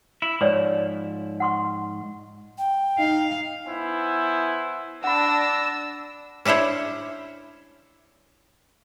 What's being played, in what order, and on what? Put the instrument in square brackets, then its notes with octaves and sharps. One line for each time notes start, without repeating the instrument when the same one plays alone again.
[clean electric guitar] E4
[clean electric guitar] G#2 F3 [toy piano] C#5 D5 C#6
[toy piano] F#5 C6 C#6
[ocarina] G5
[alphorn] D#4 [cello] F5
[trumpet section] B3 E4 C5 G#5
[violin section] D4 A#6 [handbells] F#5 B5 [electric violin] E6
[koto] C#4 D4 E4 C5 C#5